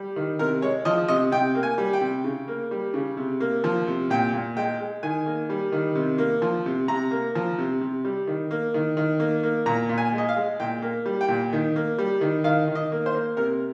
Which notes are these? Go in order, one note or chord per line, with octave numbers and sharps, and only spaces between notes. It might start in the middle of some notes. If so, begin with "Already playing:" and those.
Already playing: G3
D#3
C3 A#4
G#3 C#5
F3 D#5
C3 D#5
C3 G5
A#3
G#5
G3
G5
C3
C#3
A#3
G3
C#3
C3
A#3
F3
C3
A#2 G5
A#2
G#3 G5
G#3
D#3 G#5
A#3
G3
D#3
C3
A#3
F3
C3
C3 A#5
A#3
F3
C3
C3
G3
D#3
A#3
D#3
D#3
A#3
A#3
A#2 A#5
A#2
G#5
G#3
D#5
F5
G#3
A#2 G5
A#3
G3
G5
A#2
D#3
A#3
G3
D#3
D#3 F5
D#3
D#5
A#3
C5
A#3
C3 A#4